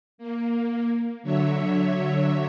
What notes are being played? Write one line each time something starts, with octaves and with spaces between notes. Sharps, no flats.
A#3
D3 F#3 C#5 E5